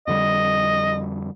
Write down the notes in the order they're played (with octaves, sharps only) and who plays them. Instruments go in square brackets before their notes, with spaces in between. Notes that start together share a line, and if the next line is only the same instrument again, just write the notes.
[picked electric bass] F2 D3 G3 [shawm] D#5